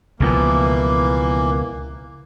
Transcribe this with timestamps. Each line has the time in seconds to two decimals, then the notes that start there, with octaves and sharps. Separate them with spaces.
0.20 C#2 B2 E3 F3 A#3